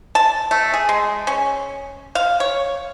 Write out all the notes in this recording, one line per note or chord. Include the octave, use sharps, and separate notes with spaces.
A5
A3
G#4
G#3
C#4
F5
C#5